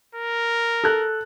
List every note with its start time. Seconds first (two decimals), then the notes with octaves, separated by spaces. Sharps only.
0.15 A#4
0.84 A4 F#6